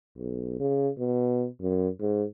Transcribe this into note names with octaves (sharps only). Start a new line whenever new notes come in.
B1
C#3
B2
F#2
G#2